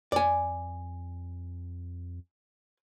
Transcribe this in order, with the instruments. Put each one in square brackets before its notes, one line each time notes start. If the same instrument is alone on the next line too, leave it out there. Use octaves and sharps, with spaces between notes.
[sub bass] F2 [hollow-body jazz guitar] D5 G#5